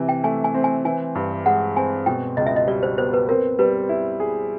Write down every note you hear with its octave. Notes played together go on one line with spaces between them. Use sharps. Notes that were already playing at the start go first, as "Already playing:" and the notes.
Already playing: C3 E3
G5
A3 G#5
G#5
C4
G#5
E3 G#5
G2
G#3 F#5
C4 G#5
B2 G5
C#2 D#5
E5
D#5
G3 D5
C5
B3 C5
B4
C4 A#4
G3 B4
E4
G#4